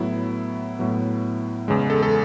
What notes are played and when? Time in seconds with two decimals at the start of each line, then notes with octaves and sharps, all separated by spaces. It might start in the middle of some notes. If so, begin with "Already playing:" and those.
Already playing: A2 F#3 B3 E4
0.79 A2 F#3 B3
1.68 E2 C#3 G#3
1.90 A4
2.03 A4